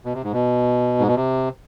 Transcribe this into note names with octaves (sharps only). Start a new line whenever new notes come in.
B2
C3
G#2
B2
G#2
B2
C3